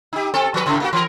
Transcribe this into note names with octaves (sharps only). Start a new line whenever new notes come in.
D#4 G4
C4 A4
F3 B4
A2 C#3 A3
A#3 D#4 F#4
E3 A#4